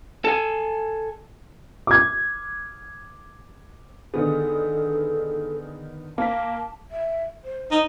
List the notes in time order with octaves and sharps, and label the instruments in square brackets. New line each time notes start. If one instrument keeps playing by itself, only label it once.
[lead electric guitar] A4 G#5
[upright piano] D6 G#6
[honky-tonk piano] D3 D#3 B3 [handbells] G#4 [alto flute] A4
[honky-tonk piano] A#3 [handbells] F5 B6 [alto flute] A5
[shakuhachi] E5
C5
[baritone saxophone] D#4